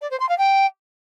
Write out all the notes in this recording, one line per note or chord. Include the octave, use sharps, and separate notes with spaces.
D5
C5
C6
F5
G5